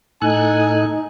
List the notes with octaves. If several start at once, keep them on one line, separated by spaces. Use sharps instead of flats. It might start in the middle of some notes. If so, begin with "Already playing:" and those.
A2 D#4 A4 G#5 F#6